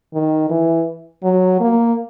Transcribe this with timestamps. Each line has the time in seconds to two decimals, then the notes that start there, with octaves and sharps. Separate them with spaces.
0.14 D#3
0.50 E3
1.23 F#3
1.60 A#3